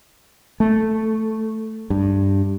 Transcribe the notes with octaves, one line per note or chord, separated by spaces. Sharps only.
A3
G2